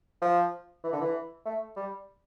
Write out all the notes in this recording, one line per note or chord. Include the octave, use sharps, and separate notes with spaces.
F3
E3
D3
E3
A3
G3